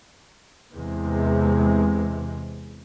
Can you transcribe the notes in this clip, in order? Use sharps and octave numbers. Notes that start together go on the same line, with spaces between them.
E2 C3 G#3